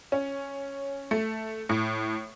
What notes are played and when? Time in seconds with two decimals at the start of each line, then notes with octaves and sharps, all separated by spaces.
0.12 C#4
1.11 A3
1.69 A2